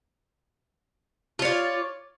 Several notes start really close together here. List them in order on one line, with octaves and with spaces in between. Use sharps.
F4 C#5 D5